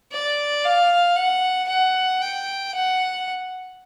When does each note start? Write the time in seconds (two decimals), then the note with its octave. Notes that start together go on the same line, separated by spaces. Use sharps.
0.11 D5
0.64 F5
1.16 F#5
1.68 F#5
2.22 G5
2.74 F#5